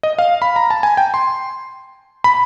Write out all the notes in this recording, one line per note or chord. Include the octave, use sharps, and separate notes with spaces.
D#5
F5
B5
A#5
A5
G#5
G5
C6
B5